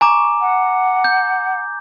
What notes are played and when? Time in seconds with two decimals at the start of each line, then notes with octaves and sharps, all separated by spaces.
0.01 G#5 A#5 C#6 D6
0.40 F#5
1.04 G6